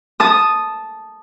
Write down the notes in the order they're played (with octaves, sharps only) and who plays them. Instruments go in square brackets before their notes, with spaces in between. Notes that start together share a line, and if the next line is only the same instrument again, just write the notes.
[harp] A5 D#6